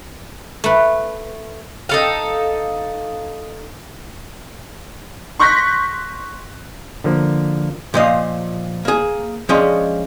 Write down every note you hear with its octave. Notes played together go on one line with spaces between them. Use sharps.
A3 B4
D#4 A4 F5
C6 C#6 F#6 G6 A#6 B6
D3 F3 A#3
A#2 F3 D#5 F5
A#3 G#4
F3 G#3 C#4 D4 D#5